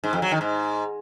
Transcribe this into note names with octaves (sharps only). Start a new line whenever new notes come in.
G#2
F2
F#3
D#3
G#2